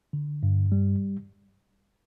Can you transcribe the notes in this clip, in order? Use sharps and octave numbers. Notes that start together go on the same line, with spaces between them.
D3
G2
G3